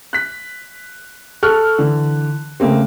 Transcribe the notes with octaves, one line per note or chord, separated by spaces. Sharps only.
F#6 B6
A4 C#6 F6 F#6
D3 E3
C#3 A3 A#3 C4